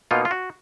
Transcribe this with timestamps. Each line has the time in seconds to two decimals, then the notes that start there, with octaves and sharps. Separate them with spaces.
0.11 B2 A#3 D#4 F4
0.25 F4
0.31 F#4